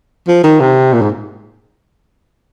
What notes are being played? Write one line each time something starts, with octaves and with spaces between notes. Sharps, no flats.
F3
D#3
C3
A#2
G#2